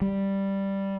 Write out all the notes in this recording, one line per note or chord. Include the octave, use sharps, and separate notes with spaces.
G3